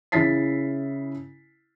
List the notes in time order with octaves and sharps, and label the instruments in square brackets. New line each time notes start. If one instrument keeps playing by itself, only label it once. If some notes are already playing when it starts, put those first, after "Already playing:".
[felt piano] C#3 E4 A6 B6 C7